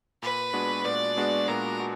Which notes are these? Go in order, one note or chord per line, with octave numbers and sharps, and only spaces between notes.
A#2 B4
G#3 B3 D4 F#4
A#2 D5
G#3 B3 D4 F#4
A#2 A#4
F#4